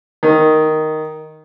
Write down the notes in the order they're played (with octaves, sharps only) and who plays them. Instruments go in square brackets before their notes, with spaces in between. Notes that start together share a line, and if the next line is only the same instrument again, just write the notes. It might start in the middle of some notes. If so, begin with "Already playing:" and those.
[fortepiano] D#3